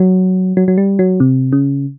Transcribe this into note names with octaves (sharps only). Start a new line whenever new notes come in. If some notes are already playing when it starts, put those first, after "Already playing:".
Already playing: F#3
F#3
F#3
G3
F#3
C3
C#3